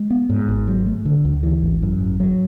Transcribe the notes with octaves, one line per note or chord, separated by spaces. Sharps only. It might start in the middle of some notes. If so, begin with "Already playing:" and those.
Already playing: G#3
B3
G#2
G#1
F#3
A3
D3
D2
E3
G#1
F#2
G#1
F#3